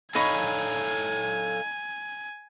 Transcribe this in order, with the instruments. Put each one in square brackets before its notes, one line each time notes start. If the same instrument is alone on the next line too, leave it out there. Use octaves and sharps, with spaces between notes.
[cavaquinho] D#4 B5 C#6 [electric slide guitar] A4 C#5 F5 [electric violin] G#5